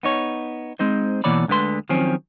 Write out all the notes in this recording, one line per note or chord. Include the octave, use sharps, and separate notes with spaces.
B3 D#4 C#5
G#3 C4 D#4 C5
B2 E3 A#3 C#5 D5 B5
D2 D3 G#3 B4 C6
D#3 F3 F#3 C4 C#4